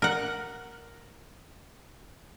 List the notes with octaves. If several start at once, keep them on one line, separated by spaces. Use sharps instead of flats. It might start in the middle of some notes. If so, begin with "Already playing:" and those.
A#4 F#5